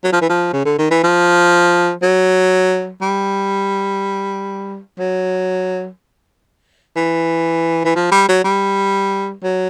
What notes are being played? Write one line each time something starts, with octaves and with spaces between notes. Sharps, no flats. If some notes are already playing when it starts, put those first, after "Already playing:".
F#3
F3
E3
F3
C#3
D3
D#3
E3
F3
F#3
G3
F#3
E3
E3
F3
G3
F#3
G3
F#3